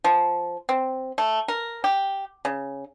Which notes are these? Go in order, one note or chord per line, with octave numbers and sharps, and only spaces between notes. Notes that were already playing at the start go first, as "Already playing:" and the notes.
F3
C4
A3
A#4
G4
C#3